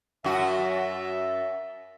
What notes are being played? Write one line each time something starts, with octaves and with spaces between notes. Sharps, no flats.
F#2 F#4 E5